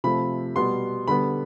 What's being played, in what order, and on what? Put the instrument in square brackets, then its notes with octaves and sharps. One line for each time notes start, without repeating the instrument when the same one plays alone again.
[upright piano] C3 F3 A3 B5
B2 G3 B3 C6
D3 G3 B3 B5